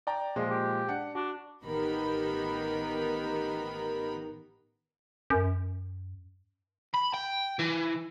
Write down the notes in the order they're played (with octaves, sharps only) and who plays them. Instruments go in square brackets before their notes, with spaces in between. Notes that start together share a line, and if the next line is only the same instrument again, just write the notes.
[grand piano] D5 G5 A#5
A#2 F3 G#3
[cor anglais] G4
[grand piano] D4 F#5
[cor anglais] D4 [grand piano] F#4
[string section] A1 D#3 B3 G4 A#4 B5
[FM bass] F#2
[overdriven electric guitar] B5
G5
E3